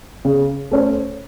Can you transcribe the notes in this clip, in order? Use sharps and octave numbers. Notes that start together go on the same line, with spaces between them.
C#3
A3 C#4 A4 C5